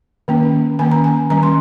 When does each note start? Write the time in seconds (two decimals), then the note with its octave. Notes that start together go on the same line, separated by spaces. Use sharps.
0.28 D#3 A#3 C#4
0.79 D#3 A#3 C#4 G#5
0.92 A#5
1.04 G#5
1.30 D#3 G3 C#4 A#5
1.43 C6